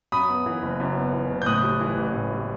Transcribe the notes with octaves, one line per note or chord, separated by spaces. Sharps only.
F#2 B5 D#6
B3
E3
F#1
F#2
B3
E3
F#1
G6
A2 D#6 F#6
G3
E3
A1
A2
G3